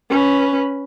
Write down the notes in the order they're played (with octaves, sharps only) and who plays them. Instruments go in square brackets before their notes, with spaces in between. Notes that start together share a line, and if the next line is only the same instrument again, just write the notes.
[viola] C#4 B4